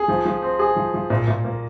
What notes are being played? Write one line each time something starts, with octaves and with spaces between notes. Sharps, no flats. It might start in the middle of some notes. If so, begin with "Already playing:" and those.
Already playing: G#4
F3
F3
C4
G#4
F3
F3
A#2
A#2
A#3